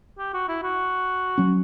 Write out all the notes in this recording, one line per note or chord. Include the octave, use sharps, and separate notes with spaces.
G4
F#4
E4
F#4
F#3 C#4